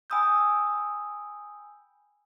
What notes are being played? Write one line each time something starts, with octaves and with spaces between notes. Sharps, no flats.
G5 G#5 B5 D#6 E6 G6